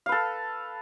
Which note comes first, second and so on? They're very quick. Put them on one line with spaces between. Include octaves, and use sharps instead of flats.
F5 B4 A4